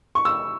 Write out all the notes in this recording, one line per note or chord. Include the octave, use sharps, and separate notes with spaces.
C#6
E6